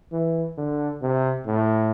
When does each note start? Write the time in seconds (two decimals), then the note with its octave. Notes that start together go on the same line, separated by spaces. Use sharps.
0.12 E3
0.58 D3
1.02 C3
1.47 A2